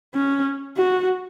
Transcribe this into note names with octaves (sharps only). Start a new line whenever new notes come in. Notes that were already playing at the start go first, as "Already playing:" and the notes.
C#4
F#4